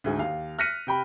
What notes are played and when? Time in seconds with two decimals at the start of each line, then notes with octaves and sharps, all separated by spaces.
0.04 D2 G#2
0.18 D#2 F5
0.59 F6 F#6 A#6 B6 C#7 D#7
0.87 C3 G5 B5